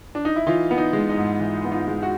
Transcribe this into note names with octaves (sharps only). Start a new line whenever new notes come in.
D4
D#4
E4
E3 D#4 F4
B3
D#4
G#3
D#4
G#2
E3
B3
D#4 F4
G#3
F#4